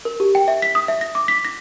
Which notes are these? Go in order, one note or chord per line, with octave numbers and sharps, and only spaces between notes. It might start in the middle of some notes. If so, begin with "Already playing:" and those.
A#4
G4
G5
E5
B6
D#6
E5
A#6
D6
B6
A#6